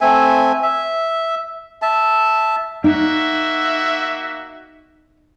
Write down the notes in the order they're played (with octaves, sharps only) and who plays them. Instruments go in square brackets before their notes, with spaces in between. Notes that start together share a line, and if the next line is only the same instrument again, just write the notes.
[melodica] A3 C4 E5 G#5
E5
E5 A5
[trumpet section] A#3 F#4 E5 [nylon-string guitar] D#4